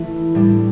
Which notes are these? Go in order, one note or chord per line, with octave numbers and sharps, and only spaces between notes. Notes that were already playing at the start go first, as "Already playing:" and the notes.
Already playing: E3 A3 E4
A2 G3 D4